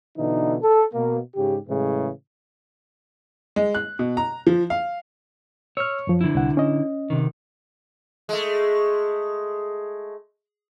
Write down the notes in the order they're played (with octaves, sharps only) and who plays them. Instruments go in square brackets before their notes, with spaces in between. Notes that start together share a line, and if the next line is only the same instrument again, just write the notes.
[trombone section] B2 D3 E3 D#4
A4
B2 A#3
G#2 C#3 G4
A2 C#3 E3 G#3
[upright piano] G#3
F#6
B2
A#5
F3
F5
[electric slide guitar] C#5 [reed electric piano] E6 F6
[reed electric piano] F#2 F3
[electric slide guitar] D3 E4
[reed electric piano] C2 F#5
C#4 D#5
[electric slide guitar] C3 D#3
[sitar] G#3 A3